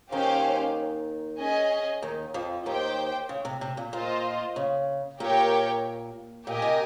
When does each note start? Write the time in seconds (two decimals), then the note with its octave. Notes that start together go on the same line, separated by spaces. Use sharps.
0.12 D#2 D#3 C#4 G4 C5 F5
1.39 C#4 G#4 D#5 G#5
2.02 D#2 D#3
2.34 F2 F3
2.66 D#2 D#3 G4 C5 G5
3.29 C#3
3.45 C3
3.61 C3
3.77 A#2
3.93 A#2 F4 C5 D#5
4.56 C#3
5.20 A#2 G4 A#4 C#5 G5
6.46 A#2 G4 A#4 D#5 G#5
6.62 C3